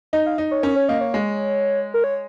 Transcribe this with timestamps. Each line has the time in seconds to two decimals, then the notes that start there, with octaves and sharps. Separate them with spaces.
0.13 D#4 D#5
0.26 F5
0.38 D#4 D#5
0.51 C#5
0.63 C#4 A#4
0.76 C#5
0.88 A#3 D#5
1.01 C#5
1.14 G#3
1.94 A#4
2.04 C#5